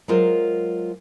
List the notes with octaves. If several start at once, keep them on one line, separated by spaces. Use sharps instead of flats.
F#3 G#3 F4 A#4 C5